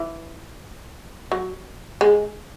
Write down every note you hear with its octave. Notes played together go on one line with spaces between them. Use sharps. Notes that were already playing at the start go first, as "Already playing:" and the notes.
Already playing: E3
F#3
G#3